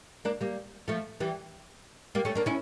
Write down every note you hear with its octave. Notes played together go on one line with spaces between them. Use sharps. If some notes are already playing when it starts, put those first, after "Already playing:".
A#3 D4
G3 A#3
F3 A3
E3 G3
G3 A#3
A3 C#4
A#3 D4
C#4 E4